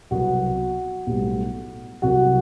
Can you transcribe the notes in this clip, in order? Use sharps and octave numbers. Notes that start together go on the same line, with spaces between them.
C2 B2 F#3 B3 F#4
B1 A2 G3 B3
C2 C3 F#3 F#4